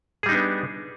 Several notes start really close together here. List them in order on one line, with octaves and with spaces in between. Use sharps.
G#4 G3 D#4 D4 B3